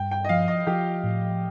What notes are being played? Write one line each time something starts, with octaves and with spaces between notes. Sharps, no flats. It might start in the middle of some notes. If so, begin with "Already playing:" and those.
Already playing: G2 G5
G5
D#5
F3 F5
D#5
F3 G4
A2